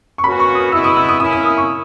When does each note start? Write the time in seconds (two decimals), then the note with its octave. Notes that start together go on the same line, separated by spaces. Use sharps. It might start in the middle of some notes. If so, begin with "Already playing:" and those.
0.18 C#6
0.23 A#3 C#4 F#4 B4 B5
0.40 C#6
0.55 D#6
0.72 G#3 B3 E4 E6
0.84 D#6
0.97 E6
1.09 D#6
1.20 A#3 C#4 E4 D#6
1.33 D#6
1.45 D#6
1.57 C#6